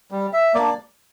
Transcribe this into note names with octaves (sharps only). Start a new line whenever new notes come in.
G3
E5
A#3 D4 D5